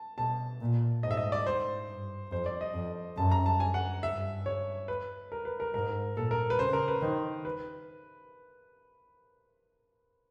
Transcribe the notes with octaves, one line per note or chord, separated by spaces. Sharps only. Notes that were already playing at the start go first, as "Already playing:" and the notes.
Already playing: A5
B2 A5
A#2
G#2 D#5
E5
D#5
D5
G#2 C5
G2
F2 C5
D5
D#5
F2
F#2 A5
A#5
A5
G#5
F#5
G2 E5
C#5
B4
A#4
B4
A#4
G#2 A#4
A#2 A4
A#4
B4
C#3 C5
A#4
B4
D#3 C5
B4